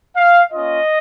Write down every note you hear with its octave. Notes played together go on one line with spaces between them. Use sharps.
F5
A#3 C#4 F4 D#5